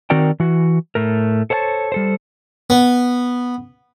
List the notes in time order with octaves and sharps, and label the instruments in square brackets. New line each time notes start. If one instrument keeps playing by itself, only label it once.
[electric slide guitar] D#3 C4 F#4 A#4 D5 G5
E3 F#4
A2 A3 A#4
A4 C5 C#5 F#5 A5
G3 A4 C5
[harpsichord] B3